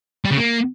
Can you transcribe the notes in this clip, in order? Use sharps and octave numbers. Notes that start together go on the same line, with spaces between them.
G3
C#3
A#3